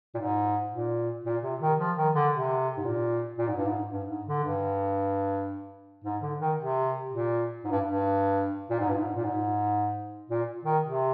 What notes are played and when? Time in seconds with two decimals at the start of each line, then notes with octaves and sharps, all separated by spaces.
0.14 A#2
0.18 G#2
0.72 A#2
1.25 A#2
1.43 C3
1.61 D#3
1.79 F3
1.97 D#3
2.14 D3
2.31 C3
2.77 G#2
2.85 A#2
3.38 A#2
3.48 G#2
3.57 G2
3.66 G#2
3.91 G2
4.10 G#2
4.27 D3
4.44 G2
6.04 G#2
6.21 D3
6.39 D#3
6.57 C3
7.11 A#2
7.64 G#2
7.71 G2
7.86 G2
8.70 A#2
8.80 G#2
8.88 G2
8.97 G#2
9.15 A#2
9.24 G#2
10.30 A#2
10.65 D#3
10.83 C3